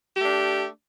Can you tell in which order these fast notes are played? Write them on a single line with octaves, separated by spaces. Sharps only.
G4 A3 D4